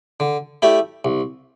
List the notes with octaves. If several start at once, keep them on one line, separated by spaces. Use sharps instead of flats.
D3
A3 E4 G4 D5
C2